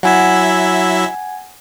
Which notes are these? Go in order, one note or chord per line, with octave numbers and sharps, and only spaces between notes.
F#3 E4 E5 F#5 G#5 G#6